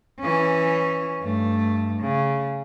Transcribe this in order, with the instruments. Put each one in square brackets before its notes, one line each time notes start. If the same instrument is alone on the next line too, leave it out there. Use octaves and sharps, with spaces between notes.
[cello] E3 C#4
G2 A3
C#3